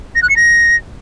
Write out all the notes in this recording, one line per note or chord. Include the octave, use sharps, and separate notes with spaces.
A#6
F#6
C#7
A#6